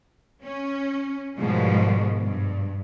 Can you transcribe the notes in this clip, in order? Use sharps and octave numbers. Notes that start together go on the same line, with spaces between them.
C#4
G#2 B2 D#3 F3 G3 G#3
G2